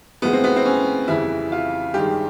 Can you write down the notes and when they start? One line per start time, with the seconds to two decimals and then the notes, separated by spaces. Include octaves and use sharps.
0.22 A2 F3 G#3 B3
0.33 C4
0.44 B3
0.56 C4
0.65 C#4
1.08 F2 C#3 E3 G3 E4
1.52 F4
1.94 G2 D#3 G#3 G4